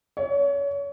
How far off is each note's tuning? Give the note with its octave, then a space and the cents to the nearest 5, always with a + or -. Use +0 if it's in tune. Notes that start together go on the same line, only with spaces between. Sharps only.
C#5 +30